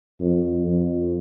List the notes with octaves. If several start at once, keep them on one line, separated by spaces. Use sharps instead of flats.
F2
F2